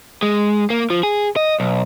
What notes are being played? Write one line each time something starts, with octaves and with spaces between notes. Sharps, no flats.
G#3
A#3
F3
G#4
D#5
B1